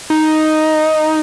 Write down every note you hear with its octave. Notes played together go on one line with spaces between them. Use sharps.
D#4